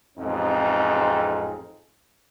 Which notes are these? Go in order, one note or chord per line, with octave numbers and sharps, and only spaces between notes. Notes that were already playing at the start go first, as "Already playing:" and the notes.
A1 F2 G#2 C4 D#4 G#4